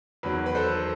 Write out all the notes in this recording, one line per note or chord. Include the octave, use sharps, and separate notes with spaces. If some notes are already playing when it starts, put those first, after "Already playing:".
E2 D#3 F#3 B4
B4
A4 C5